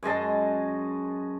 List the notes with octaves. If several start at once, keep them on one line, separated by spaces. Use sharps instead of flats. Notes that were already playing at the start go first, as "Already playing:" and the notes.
F#2 G#3 D#5 A5